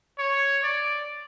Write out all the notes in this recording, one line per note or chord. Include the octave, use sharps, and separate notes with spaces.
C#5
D5